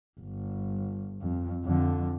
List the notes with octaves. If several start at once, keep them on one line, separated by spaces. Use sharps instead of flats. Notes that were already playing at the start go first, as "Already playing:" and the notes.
G1
F2
F2 D3